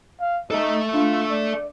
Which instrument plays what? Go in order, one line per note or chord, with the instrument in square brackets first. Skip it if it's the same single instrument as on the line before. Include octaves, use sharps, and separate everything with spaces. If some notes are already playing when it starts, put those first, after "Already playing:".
[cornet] F5
[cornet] D#4 [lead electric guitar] A4 E5
[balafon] D4 [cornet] F4
[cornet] D5